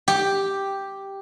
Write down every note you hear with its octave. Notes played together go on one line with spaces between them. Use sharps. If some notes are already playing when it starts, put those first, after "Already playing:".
G4